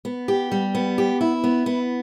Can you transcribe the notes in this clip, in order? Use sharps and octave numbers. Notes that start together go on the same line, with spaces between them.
B3
G4
G3
B3
G4
E4
B3
B3